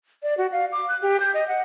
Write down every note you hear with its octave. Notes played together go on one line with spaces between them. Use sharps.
D5
F#4
F5
D6
F#6
G4
G6
D#5
F#5